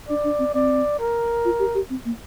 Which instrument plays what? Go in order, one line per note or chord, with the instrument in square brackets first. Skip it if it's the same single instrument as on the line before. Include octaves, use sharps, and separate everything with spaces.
[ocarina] D4 [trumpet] D5
[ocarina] D4
C4
[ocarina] C4 [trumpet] D5
[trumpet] A#4
[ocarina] F4
G4
G4
C4
A#3